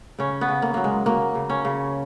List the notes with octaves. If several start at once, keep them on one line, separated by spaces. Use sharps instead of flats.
C#3 C#4
B3
C#3
A#3
F#3 A#3
G#3
F#3 A#3
C#3
C#4
C#3